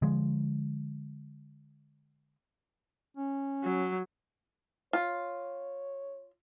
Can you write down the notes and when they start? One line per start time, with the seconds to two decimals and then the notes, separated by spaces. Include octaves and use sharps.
0.02 D3 F3 G#3
3.17 C#4
3.64 F#3
4.93 F4 C#5